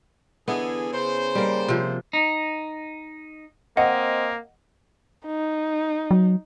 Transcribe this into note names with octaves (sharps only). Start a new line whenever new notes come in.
D3 E3 B3 E4 G#4
C#3 C5
G3 A#3
C3 F3
D#4
A#3 C4 D#5 F#5
D#4
F#3